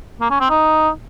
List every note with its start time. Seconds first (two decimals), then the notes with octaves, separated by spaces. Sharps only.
0.21 A#3
0.31 C#4
0.40 C4
0.50 D#4